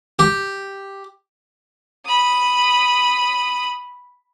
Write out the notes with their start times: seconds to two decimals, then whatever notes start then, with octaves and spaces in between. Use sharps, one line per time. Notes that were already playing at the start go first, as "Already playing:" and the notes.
0.19 G4
2.06 B5 D#6